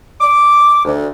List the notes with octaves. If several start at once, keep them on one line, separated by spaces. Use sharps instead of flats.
D6
D2